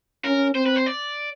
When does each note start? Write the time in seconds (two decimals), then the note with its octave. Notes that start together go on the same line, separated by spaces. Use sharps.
0.25 C#4 A#4
0.55 C4 C5
0.66 B4
0.76 C5
0.86 D5